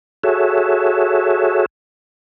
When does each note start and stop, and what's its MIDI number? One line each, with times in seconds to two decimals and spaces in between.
0.24 1.66 66
0.24 1.66 68
0.24 1.66 69
0.24 1.66 73
0.24 1.66 76